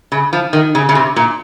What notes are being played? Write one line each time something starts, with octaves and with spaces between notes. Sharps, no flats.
C#3
F3
D#3
C#3
C#3
C3
A#2